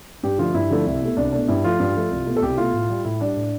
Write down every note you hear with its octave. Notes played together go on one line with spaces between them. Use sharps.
G2 G4
D3 F3 A3 F4
G2 E4
D3 F3 A3
C2
B2 A3
C2 D4
B2 A3 D4
G2 E4
F3 A3 F4
G2
F3 A3
C2
B2 A3
A4
C2 G4
B2 A3 F4
A2
G3
A2 E4
G3 D4
A2